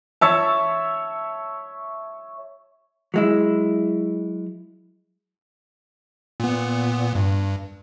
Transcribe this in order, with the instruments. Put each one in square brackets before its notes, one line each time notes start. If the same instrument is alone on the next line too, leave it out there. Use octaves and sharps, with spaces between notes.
[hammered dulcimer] C#5 E5 A5
[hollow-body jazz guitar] F#3 G#3 E4
[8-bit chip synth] A#2 B3
G2